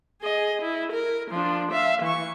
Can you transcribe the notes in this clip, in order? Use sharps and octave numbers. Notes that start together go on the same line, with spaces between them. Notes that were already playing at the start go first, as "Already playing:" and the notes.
G#4 D#5
E4
A#4
F3 D4
E5 F5
E3 C#6